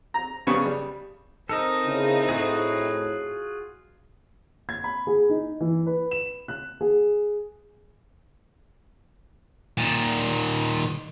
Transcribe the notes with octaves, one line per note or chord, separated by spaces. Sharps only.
A#5
G2 C#3 B3 C#6
G3
C4 D#4 A4 A#4 D#5
C#3 E4
A2 F4 F#4 G#4
G#6
B5
G#4
D#4
E3
B4
E7
F#6
G#4
A#2 D#3